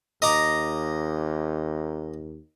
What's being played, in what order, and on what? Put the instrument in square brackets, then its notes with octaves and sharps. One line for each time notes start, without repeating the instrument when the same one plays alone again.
[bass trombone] D#2 [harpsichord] D#5 A#5 D6